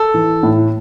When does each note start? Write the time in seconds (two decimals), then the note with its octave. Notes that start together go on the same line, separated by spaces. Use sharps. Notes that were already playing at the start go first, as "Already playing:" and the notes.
Already playing: A4
0.14 E3
0.43 A2